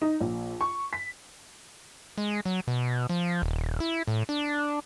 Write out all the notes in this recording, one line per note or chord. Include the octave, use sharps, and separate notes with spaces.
D#4
A#1
C#6
B6
G#3
F#3
B2
F3
D#1
E4
A2
D4